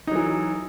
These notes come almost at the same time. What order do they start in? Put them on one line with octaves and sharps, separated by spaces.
D#4 F#3 E3